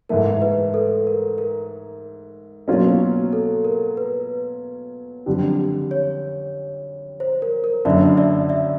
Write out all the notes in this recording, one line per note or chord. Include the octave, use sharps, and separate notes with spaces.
G#2 E3 A3 A#4
B4
A4
A#4
A#4
B2 F#3 A#3 C#4 F4
A4
A#4
B4
F#1 F2 D3 G3
C#5
C5
A#4
A#4
F#1 F#2 D3 D5 E5
D5 E5
D5 E5